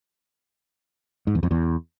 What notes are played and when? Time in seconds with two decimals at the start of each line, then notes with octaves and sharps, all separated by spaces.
1.27 G#2
1.35 E2
1.43 F2
1.51 E2